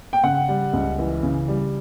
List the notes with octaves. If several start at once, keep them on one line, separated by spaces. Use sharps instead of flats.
G5
C#3 F#5
G3
C#2
E3
C#3
G3